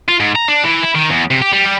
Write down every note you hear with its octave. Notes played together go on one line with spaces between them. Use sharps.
F4
G#2
A#5
D4
E3
E4
D#3
E2
C3
G4
G3
G3